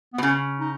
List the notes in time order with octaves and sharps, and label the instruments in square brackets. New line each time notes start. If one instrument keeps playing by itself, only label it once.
[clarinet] B3
[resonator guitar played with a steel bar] B2
[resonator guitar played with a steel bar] C#3 [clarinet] C#4
[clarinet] D#4